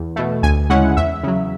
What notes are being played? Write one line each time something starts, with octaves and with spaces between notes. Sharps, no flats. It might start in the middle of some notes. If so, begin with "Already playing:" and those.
Already playing: E2
B2 A3
D2 G#5
C#3 G#3 C#4 E4 F#5
E2 E5
C#3 F#3